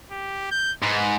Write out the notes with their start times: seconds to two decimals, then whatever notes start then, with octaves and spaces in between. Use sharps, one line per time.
0.11 G4
0.51 G6
0.82 G#2 B4